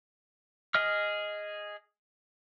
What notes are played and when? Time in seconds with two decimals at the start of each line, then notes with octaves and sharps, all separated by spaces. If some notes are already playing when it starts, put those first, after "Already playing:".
0.75 G#4 D#5 F6